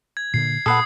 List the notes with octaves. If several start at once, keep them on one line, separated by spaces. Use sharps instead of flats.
G#6
A#2 D3 C7
A#2 A4 B4 F#5 D#6 C7